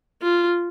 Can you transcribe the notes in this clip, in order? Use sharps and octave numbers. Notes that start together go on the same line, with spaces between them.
F4